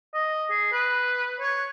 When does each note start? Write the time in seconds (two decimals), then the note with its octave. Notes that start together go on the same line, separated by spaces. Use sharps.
0.14 D#5
0.50 G#4
0.72 B4
1.40 C#5